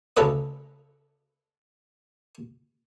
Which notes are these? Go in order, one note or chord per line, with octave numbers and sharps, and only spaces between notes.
D2 C#3 A4 B4 D#5